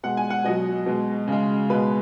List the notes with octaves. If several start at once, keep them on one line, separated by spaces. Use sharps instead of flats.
B2 G#3 F#5
G#5
F#5
B2 F#3 D#5
B2 G#3
C#3 G#3
B2 G#3 B4